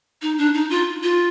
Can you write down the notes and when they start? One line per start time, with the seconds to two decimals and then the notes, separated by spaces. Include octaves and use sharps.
0.22 D#4
0.38 D4
0.54 D#4
0.70 F4
1.03 F4